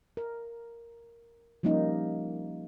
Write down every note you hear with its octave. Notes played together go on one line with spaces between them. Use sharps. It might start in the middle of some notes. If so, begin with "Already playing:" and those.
A#4
F3 G3 A#3 C#4 D#4